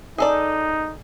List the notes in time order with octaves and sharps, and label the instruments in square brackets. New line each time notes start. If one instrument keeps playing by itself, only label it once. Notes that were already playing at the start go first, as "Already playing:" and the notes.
[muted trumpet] D#4 [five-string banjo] G#4 A4 D5